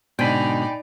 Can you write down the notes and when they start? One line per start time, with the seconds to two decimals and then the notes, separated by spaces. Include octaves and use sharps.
0.19 G#2 B2 D3 D#4 D5 G5 G#5 B5